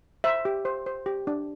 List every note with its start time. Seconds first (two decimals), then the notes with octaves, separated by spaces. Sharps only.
0.24 C5 E5
0.45 G4
0.65 C5
0.86 C5
1.06 G4
1.27 D4